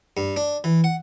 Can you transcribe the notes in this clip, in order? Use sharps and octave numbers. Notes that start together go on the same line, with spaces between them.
G2
D4
E3
F#5